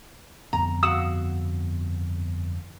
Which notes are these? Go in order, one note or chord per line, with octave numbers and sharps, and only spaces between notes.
G1 F2 B3 A#5
F#4 F5 F#5 D#6 E6 E7